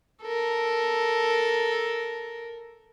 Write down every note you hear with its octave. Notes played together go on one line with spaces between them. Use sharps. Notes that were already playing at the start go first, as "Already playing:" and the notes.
A4 A#4